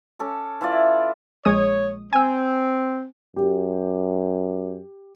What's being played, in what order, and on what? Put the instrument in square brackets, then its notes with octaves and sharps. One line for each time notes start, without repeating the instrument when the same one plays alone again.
[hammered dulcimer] C#4 A4 D6
E3 E4 F4 D5
[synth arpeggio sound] A#1 G#3 D#6 [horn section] C#5
[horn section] C4 [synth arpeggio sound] G#5 E6
[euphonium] F#2 [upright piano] G4